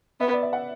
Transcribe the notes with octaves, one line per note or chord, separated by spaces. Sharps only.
B3 E5
D5
E5
F#5